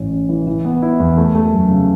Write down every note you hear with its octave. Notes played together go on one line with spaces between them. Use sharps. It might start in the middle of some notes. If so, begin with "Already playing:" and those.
Already playing: A1 C#4
C#4
E3
E3
B3
E4
E2
A3
A3
F#2
C#3